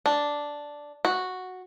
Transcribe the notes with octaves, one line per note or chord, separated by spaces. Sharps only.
D4
F#4